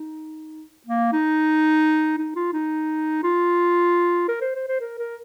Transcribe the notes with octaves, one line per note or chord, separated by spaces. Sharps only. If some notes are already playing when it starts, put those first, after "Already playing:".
Already playing: D#4
A#3
D#4
D#4
F4
D#4
F4
A#4
C5
C5
C5
A#4
A#4